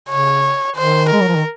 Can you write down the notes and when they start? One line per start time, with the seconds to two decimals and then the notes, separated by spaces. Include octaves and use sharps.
0.09 C#3 C#5
0.76 D#3 C5
1.10 G#3 A#4
1.21 F#3
1.28 F3
1.36 D#3